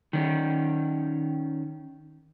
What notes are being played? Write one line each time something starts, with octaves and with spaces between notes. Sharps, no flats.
D#3 C#4